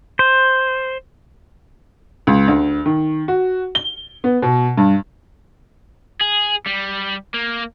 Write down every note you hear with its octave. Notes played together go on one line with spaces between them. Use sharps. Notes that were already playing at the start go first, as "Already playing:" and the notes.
C5
C#2
D2
D#3
F#4
G7
B3
B2
G2
G#4
G3
A#3